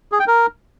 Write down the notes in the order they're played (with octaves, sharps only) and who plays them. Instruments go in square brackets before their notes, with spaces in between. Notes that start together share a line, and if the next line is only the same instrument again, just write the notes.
[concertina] G#4
G5
A#4